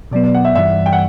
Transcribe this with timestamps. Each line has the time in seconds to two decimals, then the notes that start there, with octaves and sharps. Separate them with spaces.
0.11 B2 F#3 B3 D5
0.24 D5
0.35 F#5
0.45 E5
0.55 G2 E3 G3 E5
0.86 G5
0.93 F#5